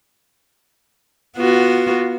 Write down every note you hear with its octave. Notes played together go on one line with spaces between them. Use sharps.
B3 F4 F#4